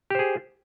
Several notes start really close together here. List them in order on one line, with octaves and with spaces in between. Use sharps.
G4 C5 G#4